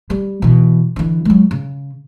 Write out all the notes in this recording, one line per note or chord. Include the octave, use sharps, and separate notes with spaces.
G3
B2 E3
D3 E3
F#3 G#3
C#3